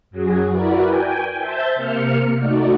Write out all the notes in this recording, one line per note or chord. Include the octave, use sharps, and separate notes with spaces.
F#2 F#3 F#4 G#4
E4 F#4 A#4 B4 D5
G5 G#5
C5 E5 A5 G6
C3 A#3 F6 C#7
A3 D#4 F#4 D5